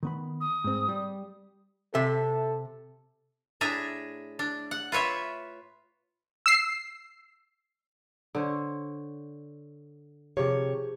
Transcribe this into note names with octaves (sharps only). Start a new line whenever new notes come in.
D#3 B3 B5
D#6
G#2 C4
G3
C3 A4 E5
A2 D4 G#4 E5 A#5
D4
F#5
F4 B4 C#5 E5
E6 C7
D3 C5 C#5
C3 F3 G4 G#4 C#5